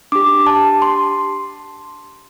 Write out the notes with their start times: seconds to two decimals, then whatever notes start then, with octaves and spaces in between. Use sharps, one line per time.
0.12 D4 G4 D6
0.47 A5
0.82 C6